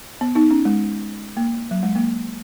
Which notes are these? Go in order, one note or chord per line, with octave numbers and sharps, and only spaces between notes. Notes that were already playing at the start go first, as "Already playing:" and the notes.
B3
B3 D#4
C#4
G#3
A#3
F#3
G#3
A#3